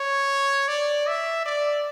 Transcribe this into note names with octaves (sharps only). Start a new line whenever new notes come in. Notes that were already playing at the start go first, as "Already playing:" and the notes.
Already playing: C#5
D5
E5
D5